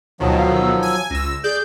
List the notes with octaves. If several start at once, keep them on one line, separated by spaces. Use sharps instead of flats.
D2 B2 D#3 F3 F#3 A5
F5
E6
G#5
C#2 E6 A#6
G#4 D5 G6